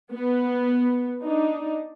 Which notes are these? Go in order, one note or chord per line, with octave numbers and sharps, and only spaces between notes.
B3
D4 D#4